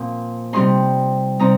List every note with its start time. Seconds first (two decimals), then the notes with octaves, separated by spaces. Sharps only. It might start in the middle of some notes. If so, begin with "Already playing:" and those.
Already playing: A#2 F3 C4
0.53 C3 G3 C4 D#4 C6
1.39 C3 G3 C4 D#4 A#5